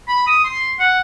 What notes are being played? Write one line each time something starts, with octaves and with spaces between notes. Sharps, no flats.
B5
D#6
C6
F#5